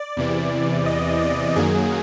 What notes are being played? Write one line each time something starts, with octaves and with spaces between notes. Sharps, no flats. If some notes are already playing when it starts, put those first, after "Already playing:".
Already playing: D5
E2 C3 E3
D#5
D5
F#2 D#3 F#3 A#3 G#4